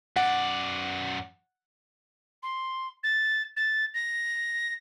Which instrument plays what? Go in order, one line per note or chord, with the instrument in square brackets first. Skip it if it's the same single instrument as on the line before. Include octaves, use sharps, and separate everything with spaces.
[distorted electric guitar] F#2 D5 [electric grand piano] F#5
[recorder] C6
A6
A6
A#6